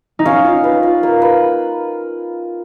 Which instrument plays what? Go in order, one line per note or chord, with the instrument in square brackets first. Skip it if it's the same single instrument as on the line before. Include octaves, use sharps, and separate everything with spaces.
[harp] D#4
[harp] C#4 [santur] F5
[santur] F4
B4
F4
A#3
B4